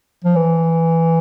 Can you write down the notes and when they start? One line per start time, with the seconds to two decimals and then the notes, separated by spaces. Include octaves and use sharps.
0.25 F3
0.36 E3